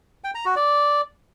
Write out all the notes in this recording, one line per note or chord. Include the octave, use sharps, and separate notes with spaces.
G5
A#5
F#4
D5